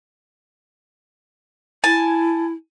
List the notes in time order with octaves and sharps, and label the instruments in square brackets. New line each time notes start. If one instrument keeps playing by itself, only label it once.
[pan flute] E4 [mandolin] G#5 A5